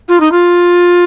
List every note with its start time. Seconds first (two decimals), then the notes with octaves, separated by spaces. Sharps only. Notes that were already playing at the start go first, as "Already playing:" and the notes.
0.08 F4
0.20 D#4
0.31 F4